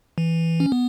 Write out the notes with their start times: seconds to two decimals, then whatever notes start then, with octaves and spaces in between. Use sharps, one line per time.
0.18 E3
0.60 C#4
0.72 B3